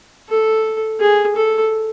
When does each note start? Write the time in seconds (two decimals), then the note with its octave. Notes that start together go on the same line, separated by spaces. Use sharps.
0.29 A4
1.00 G#4
1.36 A4